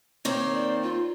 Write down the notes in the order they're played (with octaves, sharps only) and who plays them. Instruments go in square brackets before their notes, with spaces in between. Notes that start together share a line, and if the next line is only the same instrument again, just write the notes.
[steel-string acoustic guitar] D#3 A#3 C4 [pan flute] C#5
[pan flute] D5
F4